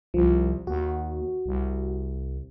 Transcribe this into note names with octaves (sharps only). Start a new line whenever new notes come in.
C2 F3
D#2 F#4
C2